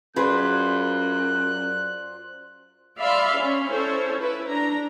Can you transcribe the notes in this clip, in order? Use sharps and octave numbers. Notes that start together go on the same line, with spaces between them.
F#2 F4 G#4 B4 C5 D5 F#6
D5 E5 F5 B5 C6
C#4
C#4 E4 A4 C5 C#5
E4 B4
D4 A#5